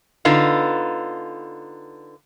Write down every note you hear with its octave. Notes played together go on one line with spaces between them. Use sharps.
D3 B3 D#4 F4